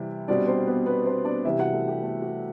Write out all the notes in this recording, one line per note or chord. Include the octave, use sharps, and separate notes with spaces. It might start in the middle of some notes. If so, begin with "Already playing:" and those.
Already playing: C3 E3 G3 E4
B2 G3 C4 D4 D5
C4 C5
B3 B4
B3 B4
C4 C5
D4 D5
C3 E3 G3 E4 E5
F#4 F#5
A3 A4
G4
A3 A4
F#4